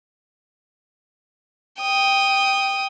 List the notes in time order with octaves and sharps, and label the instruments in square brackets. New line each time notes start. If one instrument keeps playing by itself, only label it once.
[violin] G5 D#6